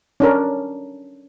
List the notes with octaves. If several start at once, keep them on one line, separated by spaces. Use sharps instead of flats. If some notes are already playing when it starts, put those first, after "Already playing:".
C#4 D4 A#4